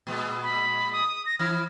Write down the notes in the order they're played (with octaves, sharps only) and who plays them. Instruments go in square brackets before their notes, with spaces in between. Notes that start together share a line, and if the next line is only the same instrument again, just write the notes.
[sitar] A#2 G#3 B3
[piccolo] B5
D#6
A#6
[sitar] E3 E4 [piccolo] F6